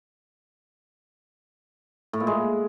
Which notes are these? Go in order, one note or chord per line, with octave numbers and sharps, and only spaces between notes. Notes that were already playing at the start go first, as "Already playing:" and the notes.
A2
A#2
G#3